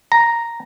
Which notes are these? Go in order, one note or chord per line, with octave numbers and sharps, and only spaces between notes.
A#5